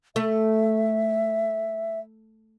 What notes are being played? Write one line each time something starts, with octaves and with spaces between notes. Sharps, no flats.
A3 E5